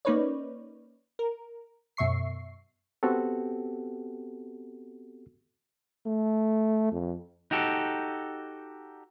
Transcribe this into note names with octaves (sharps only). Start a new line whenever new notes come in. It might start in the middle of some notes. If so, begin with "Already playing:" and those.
A#3 C#4 D#4 B4 C#5 D5
A#4
F#2 B2 E5 C#6 C7
B3 C4 F#4 G4 A4
A3
F2
D#4 F#4 G4 A4